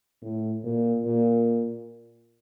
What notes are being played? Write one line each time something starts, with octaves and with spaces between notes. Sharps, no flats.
A2
A#2
A#2